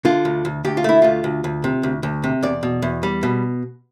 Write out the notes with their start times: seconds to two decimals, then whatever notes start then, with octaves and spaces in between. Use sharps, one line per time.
0.05 D3 F4
0.25 D2
0.45 D2
0.65 D2 G4
0.77 F4
0.84 A3 E4
1.02 D2 F4
1.24 D2
1.44 D2
1.64 C3
1.83 D2
2.03 D2
2.24 C3
2.43 E2 D5
2.63 B2
2.82 E2
3.03 G3
3.23 B2